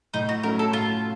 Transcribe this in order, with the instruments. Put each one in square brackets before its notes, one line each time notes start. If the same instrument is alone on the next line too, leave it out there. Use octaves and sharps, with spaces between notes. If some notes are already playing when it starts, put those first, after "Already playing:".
[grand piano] A2 [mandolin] D#4
[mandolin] F#4
[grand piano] F#3 A3 C#4 [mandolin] A#4
[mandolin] A4
[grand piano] A2 [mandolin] F4